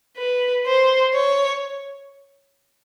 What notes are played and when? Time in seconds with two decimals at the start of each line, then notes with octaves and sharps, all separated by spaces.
0.18 B4
0.67 C5
1.14 C#5